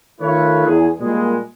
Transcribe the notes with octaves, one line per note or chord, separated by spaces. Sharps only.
D#3 A3 F4 A4 B4 C#5
E2 G#4
A#2 G3 G#3